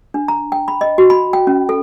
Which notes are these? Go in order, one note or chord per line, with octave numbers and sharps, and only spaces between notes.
D4
A#5
G5
B5
D#5
F#4
B5
G5
C#4
A4